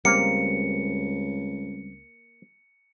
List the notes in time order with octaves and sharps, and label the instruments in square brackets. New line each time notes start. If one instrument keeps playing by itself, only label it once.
[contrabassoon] C#2 [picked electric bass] G3 C4 [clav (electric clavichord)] A#3 A#5 [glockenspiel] C#7